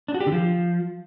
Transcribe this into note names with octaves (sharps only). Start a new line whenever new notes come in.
D4
F#4
G4
D3
F3